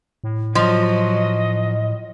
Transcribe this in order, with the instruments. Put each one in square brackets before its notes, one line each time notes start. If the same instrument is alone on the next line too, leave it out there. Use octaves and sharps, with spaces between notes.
[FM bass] A2
[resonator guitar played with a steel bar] F3 [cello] F#3 [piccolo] D#5